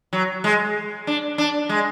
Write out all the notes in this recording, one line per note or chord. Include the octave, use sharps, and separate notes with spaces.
F#3
G#3
D4
D4
G#3